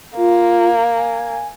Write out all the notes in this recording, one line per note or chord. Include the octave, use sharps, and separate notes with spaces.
A#3 F4
G#5